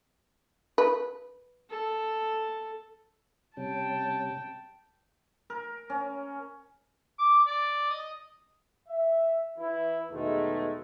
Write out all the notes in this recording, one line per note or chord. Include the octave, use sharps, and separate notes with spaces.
B4
A4
C3 G3 C#4 G5 A5
A#4
C#4
D6
D5
D#5
E5
E3 E4
E2 B2 D#3 G#3 A3